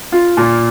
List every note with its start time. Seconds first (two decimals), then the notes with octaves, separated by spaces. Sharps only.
0.12 F4
0.37 A#2